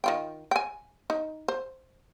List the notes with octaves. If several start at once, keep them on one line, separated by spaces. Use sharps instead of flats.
D#3 F4 G5
G5 G#5
D#4
C5